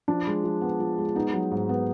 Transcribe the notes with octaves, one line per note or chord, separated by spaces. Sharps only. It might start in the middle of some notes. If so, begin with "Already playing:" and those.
F3 D4
G#3
F3
B3
F3
G#3
B3 D#4
F#3
G#2
B3